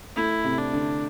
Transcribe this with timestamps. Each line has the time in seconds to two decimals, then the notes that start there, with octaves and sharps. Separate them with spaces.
0.16 A3 E4
0.44 C3
0.58 D4
0.73 D3